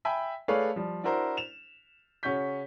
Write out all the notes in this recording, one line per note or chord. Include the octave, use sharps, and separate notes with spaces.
E5 G5 G#5 B5
A3 G#4 B4 C#5 D5 F5
F3 G3
D4 E4 F#4 A#4 C5
E7 F7
C#3 C#4 F#4 C#6 G6 B6